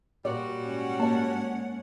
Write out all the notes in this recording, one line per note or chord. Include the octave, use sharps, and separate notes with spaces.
A#2 G3 F#4 D5
G#2 C#4 F#5
A#3 D5 A5